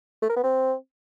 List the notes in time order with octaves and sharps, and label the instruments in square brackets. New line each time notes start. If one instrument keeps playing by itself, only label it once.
[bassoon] A3
A#4
B3
C4